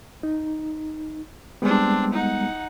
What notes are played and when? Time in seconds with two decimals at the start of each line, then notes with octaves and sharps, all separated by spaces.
0.23 D#4
1.62 G3 G#3 B3 C4 D4
2.13 D#4 F#5